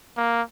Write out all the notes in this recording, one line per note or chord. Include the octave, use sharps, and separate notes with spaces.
A#3